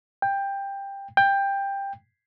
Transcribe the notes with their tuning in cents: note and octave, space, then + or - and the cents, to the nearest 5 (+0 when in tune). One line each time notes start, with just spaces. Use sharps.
G5 +15
G5 +15